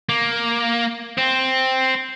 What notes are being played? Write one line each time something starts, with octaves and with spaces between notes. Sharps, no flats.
A#3
C4